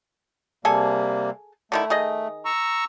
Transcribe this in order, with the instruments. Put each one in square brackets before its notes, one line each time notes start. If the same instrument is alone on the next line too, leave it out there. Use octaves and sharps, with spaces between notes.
[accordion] C3 G3 A#3 [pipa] G#4 A4 G#5
[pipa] D3 D#3 E4 [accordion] A3
[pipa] D#3 G#4 D#5
[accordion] A#5 C#6 E6